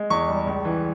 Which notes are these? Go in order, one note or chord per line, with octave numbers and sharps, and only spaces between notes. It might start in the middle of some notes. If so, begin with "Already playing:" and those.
Already playing: G#3
E2 C#6
G3
C#2
E3